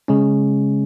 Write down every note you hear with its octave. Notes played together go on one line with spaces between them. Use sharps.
C#3 G#3 C#4